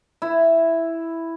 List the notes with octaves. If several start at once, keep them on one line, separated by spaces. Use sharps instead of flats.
E4